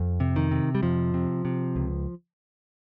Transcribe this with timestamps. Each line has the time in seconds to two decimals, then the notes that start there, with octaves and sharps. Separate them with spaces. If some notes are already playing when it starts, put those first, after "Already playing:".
Already playing: F2
0.20 C3
0.36 D#3
0.51 C3
0.75 G3
0.83 F2 F3
1.14 C3
1.45 C3
1.76 C#2